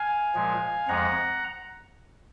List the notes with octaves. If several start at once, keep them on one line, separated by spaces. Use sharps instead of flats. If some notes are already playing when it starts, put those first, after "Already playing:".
Already playing: F5 G#5
A#2 F3 G#3
F2 F3 G#3 F#5 A#5